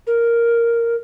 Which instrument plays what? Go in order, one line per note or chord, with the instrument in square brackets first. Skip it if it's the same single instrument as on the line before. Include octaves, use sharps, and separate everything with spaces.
[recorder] A#4